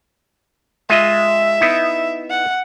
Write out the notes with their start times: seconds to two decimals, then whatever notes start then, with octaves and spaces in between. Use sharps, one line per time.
0.90 G#3 F4 D#5 E5
1.61 B3 D#4 E4
2.30 F#5